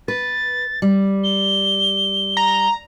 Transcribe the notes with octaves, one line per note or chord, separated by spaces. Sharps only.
B4 A6
G3
G7
A#5